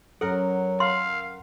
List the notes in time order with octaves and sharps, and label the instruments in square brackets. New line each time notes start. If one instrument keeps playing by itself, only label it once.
[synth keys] F#2 A#4 F#5 [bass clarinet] F#3 [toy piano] A4
[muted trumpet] F5 [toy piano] C6